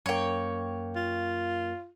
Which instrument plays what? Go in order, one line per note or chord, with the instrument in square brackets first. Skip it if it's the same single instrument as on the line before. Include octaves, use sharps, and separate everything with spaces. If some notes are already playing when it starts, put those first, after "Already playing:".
[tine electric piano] F#2 A#3 [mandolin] C#5 G5
[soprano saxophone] F4